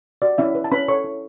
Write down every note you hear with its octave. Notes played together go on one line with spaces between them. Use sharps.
F#4 D5
C#4 E4 E5
B4
A5
C#4 B4 B5
A4 C#5 C#6
E4